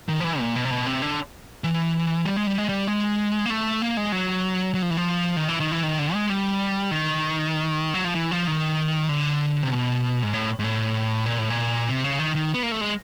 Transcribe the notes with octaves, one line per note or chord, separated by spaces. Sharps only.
D#3
F3
E3
A#2
B2
C3
B2
C3
D3
E3
G3
G#3
G3
G#3
G3
G#3
A#3
A3
A#3
G#3
F#3
F#3
F3
E3
F3
D#3
E3
D#3
E3
D#3
D3
G#3
G3
D#3
F#3
F3
E3
F3
D#3
D3
C3
B2
G#2
A2
G#2
A2
A#2
A2
A#2
C3
C#3
D#3
D#3
B3
A#3
A3
G#3